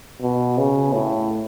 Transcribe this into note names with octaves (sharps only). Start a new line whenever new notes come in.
B2
C#3
A2